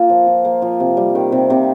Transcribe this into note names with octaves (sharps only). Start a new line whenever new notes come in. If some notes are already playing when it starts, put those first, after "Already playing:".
Already playing: A#3 F4
F3
F4
A#3
F3
C3
G3
D#3
C3
C3